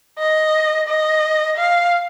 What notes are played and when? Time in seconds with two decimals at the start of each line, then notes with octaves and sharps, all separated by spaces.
0.19 D#5
0.88 D#5
1.57 F5